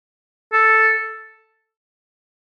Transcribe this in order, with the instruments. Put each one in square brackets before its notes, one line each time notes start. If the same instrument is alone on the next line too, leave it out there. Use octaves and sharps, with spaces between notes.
[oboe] A4